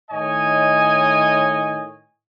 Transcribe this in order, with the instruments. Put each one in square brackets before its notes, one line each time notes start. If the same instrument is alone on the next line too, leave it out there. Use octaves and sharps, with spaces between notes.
[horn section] A2 D#3 C#5 D#5 G#5